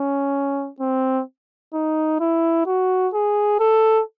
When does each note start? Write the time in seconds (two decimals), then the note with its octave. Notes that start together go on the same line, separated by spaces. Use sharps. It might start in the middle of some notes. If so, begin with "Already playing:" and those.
Already playing: C#4
0.80 C4
1.73 D#4
2.20 E4
2.66 F#4
3.14 G#4
3.60 A4